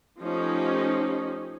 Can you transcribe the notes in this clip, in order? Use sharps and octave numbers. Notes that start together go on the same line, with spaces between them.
F3 A3 C#4 D#4 G4